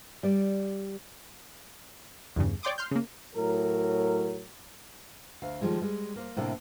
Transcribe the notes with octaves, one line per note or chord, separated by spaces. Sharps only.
G3 D5
E2 G2 C#3
C#5 D5 G5 C6 D6 D#6
C6 F6 G6
C#3 A#3
A2 F#3 A#4
D2 F5
D#3 F3 G3 G#3
G3 G#3
A#3 C5
A2 C3 A#3 D4 A4